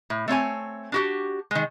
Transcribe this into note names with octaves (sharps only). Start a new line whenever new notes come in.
A2
A3 C4 C#5 G#5
D4 F#4 G4
D#3 G#3